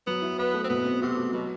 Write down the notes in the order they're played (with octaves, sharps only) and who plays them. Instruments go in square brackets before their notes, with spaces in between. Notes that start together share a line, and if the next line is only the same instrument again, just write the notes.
[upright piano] F#3 [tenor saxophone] B3
[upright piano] E4
[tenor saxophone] B3 [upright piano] B4
[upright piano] A3
[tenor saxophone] C4
[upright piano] B2 [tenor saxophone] B3
[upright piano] C4
[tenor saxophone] C3 [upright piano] F#4
[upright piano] A3
[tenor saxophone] B2 [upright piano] F#3